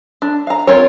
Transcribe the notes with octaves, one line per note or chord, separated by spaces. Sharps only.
D4
F5 A#5
C4 F4 A#4 C#5